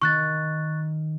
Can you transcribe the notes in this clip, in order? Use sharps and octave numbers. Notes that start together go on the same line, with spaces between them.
D#3 C#6 F#6 A6